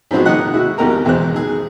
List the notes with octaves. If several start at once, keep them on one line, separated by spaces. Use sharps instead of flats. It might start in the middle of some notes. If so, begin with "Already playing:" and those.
G#2 F3 B3 C4 F#4 G#4
D#3 A#3 D#5 F#5 F#6
G#3 E4 F#4
G#1 D#2 B2 G4 A#4 A#5
B1 E2 G#3 C5 F#6
D#3 G#4